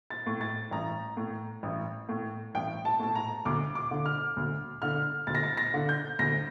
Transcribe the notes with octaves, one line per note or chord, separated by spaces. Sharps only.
A6
A2
A6
A1 A#5
A2
A1
A2
A1 G5
A5
A2 A5
A#5
D2 D6
D6
D3
F6
D2
D3 F6
D2 A6
A#6
A6
A#6
D3
G6
D2 A#6